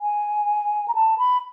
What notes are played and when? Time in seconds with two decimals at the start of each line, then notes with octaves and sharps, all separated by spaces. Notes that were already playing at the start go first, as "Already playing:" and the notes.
0.01 G#5
0.88 A#5
0.95 A5
1.18 B5